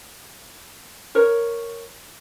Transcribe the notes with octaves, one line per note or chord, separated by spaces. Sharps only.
A#4 C#5